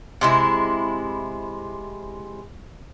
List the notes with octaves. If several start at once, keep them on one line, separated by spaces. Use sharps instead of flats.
C3 G#3 E4